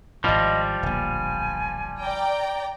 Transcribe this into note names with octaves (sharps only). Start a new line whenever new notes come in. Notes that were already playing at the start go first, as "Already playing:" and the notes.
G#1 A2 F3 G3 D#5
D1 A#1 G#5
D5 G5 A#5